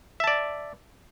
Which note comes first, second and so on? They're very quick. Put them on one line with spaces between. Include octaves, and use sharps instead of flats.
E5 A5 D5